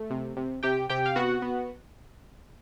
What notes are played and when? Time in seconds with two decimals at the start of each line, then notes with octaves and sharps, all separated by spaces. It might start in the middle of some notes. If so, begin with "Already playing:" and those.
Already playing: A3
0.10 C3
0.37 C3
0.63 C3 G4 G5
0.89 C3 G4 G5
1.06 F5
1.16 B3 F#4 F#5
1.42 B3